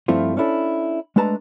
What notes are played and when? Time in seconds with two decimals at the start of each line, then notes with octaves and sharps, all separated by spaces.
0.08 G2 F3 A3 C4 E4 F4
0.37 C#4 D4 E4 A4
1.16 G#3 A3 D4 B4 A5 A#5